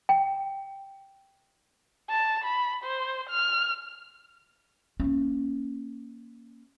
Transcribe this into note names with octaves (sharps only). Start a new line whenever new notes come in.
G5
A5
B5
C5
F6
A#3 C#4